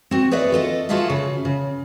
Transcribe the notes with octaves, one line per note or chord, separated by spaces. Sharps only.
C4 F#4
G#4 B4 C#5 D5 E5
F4 A4 D#5
F4 F#4 G#4 A4 E5 F5
C#3
C#3